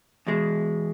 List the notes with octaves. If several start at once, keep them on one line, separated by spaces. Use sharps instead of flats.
E2 B2 G#3